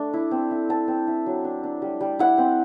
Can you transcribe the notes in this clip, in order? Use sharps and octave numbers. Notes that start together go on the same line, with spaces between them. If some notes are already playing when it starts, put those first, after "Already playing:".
Already playing: A3 D4
E4
C4
E4
C4 A5
C4
E4
F#3
D4
D4
G3
G3
E4 F#5
C4